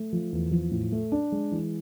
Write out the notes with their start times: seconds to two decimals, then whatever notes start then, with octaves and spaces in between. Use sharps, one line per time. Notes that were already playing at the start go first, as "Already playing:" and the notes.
Already playing: A3
0.13 F3
0.33 E2
0.51 F3
0.71 A2
0.92 A3
1.12 D4
1.32 G#3
1.52 E3